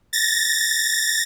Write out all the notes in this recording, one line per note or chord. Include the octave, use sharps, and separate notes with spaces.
A6 A#6